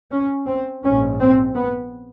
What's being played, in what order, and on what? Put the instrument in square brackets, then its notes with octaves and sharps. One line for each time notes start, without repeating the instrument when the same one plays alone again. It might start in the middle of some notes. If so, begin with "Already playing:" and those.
[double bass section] C#4
C4
A#1 G#2 C#4
C4
B3